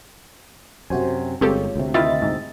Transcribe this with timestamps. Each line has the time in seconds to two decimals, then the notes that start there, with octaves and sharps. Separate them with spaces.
0.90 F#2 C3 F#4 C5 G#5
1.41 G1 G#3 C4 F4 G4 A4 C#5
1.76 D2 C3
1.94 D#3 E4 F4 D#5 E5 A6
2.22 G#2